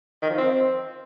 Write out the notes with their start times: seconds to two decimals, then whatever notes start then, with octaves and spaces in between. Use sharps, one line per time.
0.22 D#3
0.30 F3
0.38 C4